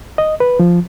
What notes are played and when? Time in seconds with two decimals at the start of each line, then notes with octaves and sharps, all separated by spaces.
0.18 D#5
0.40 B4
0.60 F3